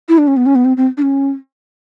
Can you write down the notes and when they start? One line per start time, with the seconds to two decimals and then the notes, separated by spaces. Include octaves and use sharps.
0.09 E4
0.18 D4
0.28 C#4
0.37 B3
0.46 C#4
0.55 B3
0.65 C4
0.77 C4
0.97 D4
1.02 C#4